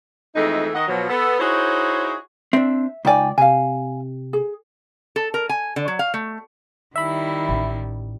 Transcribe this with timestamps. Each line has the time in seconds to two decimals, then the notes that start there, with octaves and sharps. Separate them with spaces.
0.35 F2 E3 G#3 A3 D#4
0.74 D#3 D#5 F#5
0.87 B2 F3 F#3
1.09 B3 A4
1.39 D#4 E4 F#4 G#4 C5 C#5
2.53 C4 D4 E5
3.05 C#2 D#4 D5 G5 G#5
3.38 C3 F5 G#5
4.33 G#4
5.16 A4
5.34 A#4
5.49 G#5
5.76 D3
5.88 F#3
5.99 F5
6.14 A3
6.96 D#3 G3 E4 E5 B5
7.49 A1